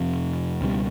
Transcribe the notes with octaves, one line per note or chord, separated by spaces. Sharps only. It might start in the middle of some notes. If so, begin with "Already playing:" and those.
Already playing: F2 C3 F3
C#2 B2 G3